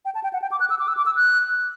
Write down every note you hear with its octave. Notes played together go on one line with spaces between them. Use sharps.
G5
A5
G5
F#5
G5
D6
F#6
E6
D6
E6
D6
E6
F#6